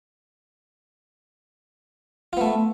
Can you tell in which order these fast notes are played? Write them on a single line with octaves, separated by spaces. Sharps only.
F4 B3 A3